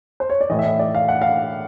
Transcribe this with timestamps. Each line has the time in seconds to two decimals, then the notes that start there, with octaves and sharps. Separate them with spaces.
0.20 C5
0.30 C#5
0.41 D5
0.50 A2 E3 D#5
0.59 E5
0.65 D#5
0.79 D5
0.95 F5
1.08 F#5
1.22 F5